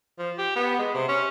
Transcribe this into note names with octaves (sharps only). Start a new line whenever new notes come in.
F3
G4
B3
G#3
C3
C#4